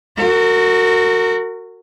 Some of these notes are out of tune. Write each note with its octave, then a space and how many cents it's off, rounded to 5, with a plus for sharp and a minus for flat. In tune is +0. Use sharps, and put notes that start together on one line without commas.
F#4 +0 A#4 -35